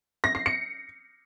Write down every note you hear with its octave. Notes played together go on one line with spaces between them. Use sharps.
A#6
C7
C#7